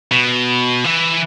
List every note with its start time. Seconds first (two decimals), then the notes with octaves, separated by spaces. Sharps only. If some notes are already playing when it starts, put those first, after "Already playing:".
0.11 B2
0.84 E3